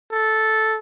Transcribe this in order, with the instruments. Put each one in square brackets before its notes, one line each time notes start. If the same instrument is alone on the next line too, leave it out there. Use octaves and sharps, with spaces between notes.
[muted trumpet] A4